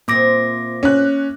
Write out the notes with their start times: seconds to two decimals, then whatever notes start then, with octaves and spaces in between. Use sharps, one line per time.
0.08 A#2 A#3 C4 D6 A#6
0.83 C#4 F#6